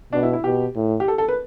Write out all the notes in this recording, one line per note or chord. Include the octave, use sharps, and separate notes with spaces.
B2 D4
E4
E4
B2 G4
A2
G4
A4
A4
B4